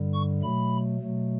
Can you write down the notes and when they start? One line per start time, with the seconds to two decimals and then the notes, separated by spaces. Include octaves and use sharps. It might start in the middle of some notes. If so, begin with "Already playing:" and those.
Already playing: G2 D3 G3
0.14 C#6
0.42 B2 F#3 A3 B5
1.00 B2 F#3 A3